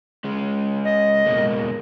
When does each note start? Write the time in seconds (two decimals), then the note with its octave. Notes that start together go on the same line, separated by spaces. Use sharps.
0.24 G#3 C#4
0.85 D#5
1.26 B2 G#3 A#3